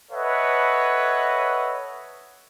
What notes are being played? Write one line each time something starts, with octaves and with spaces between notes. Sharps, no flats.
A4 B4 C#5 D#5 E5 F#5